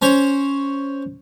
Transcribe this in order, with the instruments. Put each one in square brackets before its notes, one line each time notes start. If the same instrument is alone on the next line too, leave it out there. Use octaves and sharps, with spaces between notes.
[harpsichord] C#4 C5 C#5